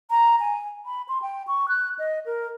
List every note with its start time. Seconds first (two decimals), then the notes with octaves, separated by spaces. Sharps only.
0.11 A#5
0.40 G#5
0.86 B5
1.09 C6
1.22 G5
1.48 C#6
1.68 F#6
1.99 D#5
2.26 A#4